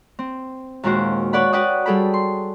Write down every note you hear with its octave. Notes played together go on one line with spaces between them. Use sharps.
C4
D#2 A#2 G#3 F#4 C5
B4 C#5 D5 F#5 B5
F#4 B4 D5 F#5 G5 D#6
G3 G#4 A4 G5 B5
C6